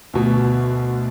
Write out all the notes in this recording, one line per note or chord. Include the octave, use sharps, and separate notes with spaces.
D2 B2